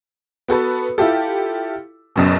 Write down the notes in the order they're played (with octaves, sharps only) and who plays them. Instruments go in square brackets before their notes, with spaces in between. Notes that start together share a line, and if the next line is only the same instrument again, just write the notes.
[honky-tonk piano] B3 F#4 A4 B4
E4 F4 G4 A4
F#1 F#2 B2